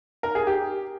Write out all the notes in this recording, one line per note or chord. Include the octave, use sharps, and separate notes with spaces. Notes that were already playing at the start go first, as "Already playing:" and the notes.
A#4
G#4
G4